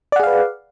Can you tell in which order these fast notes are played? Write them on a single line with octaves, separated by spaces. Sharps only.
D5 F#5 G#4 F5 B4